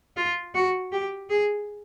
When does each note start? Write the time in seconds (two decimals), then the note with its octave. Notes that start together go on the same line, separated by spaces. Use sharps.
0.17 F4
0.54 F#4
0.92 G4
1.29 G#4